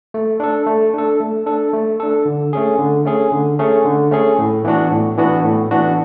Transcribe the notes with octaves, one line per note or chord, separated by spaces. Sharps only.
A3
D4 A4
A3
D4 A4
A3
D4 A4
A3
D4 A4
D3
A3 C#4 G#4
D3
A3 C#4 G#4
D3
A3 C#4 G#4
D3
A3 C#4 G#4
A2
E3 B3 D4 F#4
A2
E3 B3 D4 F#4
A2
E3 B3 D4 F#4